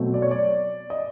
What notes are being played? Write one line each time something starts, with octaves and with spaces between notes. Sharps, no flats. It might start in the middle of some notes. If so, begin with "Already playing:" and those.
Already playing: B2 F#3 A3 C4
D5
C#5
D5
D#5